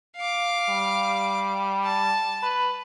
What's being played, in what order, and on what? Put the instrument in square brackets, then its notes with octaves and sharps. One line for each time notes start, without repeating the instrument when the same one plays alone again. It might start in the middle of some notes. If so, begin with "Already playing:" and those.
[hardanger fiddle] F5 D6
[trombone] G3
[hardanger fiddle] A5
[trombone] B4